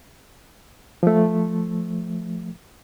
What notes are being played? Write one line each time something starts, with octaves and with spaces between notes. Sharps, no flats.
F3 A3